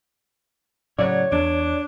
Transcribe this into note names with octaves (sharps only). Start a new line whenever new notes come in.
A2 C#3 F#3 C#5 D5
E2 D4